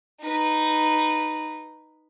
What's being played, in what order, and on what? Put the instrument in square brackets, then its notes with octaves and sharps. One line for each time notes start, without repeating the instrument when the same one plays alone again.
[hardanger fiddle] D#4 B4